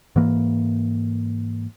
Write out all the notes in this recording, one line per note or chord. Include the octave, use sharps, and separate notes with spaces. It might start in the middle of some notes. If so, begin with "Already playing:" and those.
G#2 E3 A#3